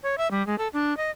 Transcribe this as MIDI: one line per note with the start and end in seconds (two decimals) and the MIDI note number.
0.03 0.15 73
0.18 0.30 76
0.31 0.45 55
0.47 0.55 56
0.58 0.68 69
0.73 0.96 62
0.97 1.10 75